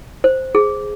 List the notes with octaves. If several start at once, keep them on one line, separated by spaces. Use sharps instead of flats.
C5
G#4